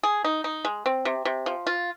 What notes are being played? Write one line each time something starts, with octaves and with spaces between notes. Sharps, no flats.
G#4
D#4
D#4
G#3
C4
C3
C3
F3
F4